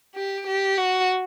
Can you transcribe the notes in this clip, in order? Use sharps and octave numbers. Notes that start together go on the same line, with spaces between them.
G4
G4
F#4